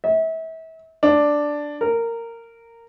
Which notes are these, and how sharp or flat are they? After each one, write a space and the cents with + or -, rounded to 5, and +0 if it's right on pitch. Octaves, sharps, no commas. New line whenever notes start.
E5 -35
D4 +0
A#4 -15